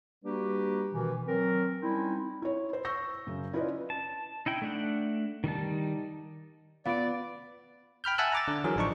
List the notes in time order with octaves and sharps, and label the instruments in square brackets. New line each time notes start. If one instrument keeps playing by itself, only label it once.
[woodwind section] G3 A#3 D4 F#4 G4 B4
B2 D#3 E3
F#3 C4 A#4
G3 C4 C#4 D#4 E4
[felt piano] E4 C#5
C5
C#6 E6 G6 A#6
F#2 C#3
C#4 E4 F4 B4 D5 D#5
[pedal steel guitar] A5
D#4 E4 G5
A3 D4 F#5
D#3 G3 D#4 A5
[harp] B3 D7 [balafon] F4 F5 [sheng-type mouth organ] D5
[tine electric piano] G5 B5 F6 G6
E5 F#5 G#5 A5 E6 F#6
A#5 D6 A6
D3
E3 F#3 G#4 A#4
A1 F3 D4 D#4 C#6